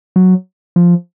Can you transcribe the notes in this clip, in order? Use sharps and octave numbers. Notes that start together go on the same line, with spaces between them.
F#3
F3